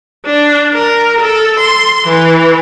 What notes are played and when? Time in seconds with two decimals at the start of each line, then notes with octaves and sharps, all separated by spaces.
0.26 D4
0.74 A#4
1.21 A4
1.60 C6
2.08 E3